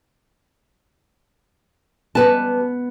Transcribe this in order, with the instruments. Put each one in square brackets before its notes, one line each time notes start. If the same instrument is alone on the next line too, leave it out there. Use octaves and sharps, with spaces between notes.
[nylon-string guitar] G3 B4 A5 [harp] B3